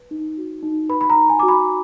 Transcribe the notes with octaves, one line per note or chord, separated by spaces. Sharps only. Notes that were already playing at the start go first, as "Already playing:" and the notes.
Already playing: B4
D#4
F#4
D#4
B4 B5
B5
A#5
D#4
G#5
F#4 D6
B5